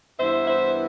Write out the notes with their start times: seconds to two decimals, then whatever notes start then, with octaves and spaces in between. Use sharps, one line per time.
0.19 G2 E3 B3 E4 C5 E5
0.47 C5 E5